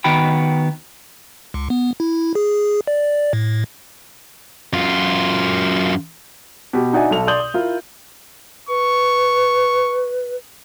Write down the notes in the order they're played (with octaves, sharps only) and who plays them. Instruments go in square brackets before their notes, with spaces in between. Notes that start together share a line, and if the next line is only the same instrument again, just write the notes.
[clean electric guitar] D#3 B3 D#4 F#4 G5 B5
[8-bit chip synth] C#2
B3
E4
G#4
D5
A2
[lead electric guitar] F#2 F4
[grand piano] B2 G4
D4 D#4 F#4 D5 E5 G#5
B1 A4 F7
D5 C6 D#6 G6 F#7
D#6
E4 F4 A#4
[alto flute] B4 [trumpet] C#6